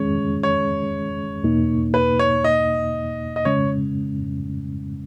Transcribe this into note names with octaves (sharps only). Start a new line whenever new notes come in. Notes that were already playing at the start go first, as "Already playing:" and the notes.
Already playing: E2 D#3 G#3 C#4 G#4 C#5
C#5
E2 B2 A#3 D#4
B4
C#5
D#5
D#5
C#3 G#3 C#4 C#5